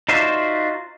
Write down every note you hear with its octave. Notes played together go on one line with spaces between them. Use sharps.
D#4 F4 F#4 C5 D5 E5